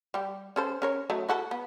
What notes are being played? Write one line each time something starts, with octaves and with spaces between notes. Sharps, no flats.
G3 G4
C#4 A4 C5
C#4 A#4 C#5
F#3 A3 D#4
E4 F#4 A4
B3